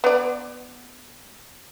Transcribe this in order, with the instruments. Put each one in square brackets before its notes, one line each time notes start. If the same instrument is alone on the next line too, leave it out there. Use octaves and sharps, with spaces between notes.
[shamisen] B3 D5